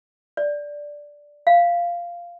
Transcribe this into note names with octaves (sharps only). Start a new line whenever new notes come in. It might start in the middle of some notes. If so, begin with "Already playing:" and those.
D5
F5